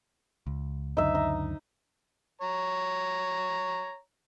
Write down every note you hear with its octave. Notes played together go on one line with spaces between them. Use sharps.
C#2
C#2 F#2 D3 D#4 E5
D#4
C#5 A#5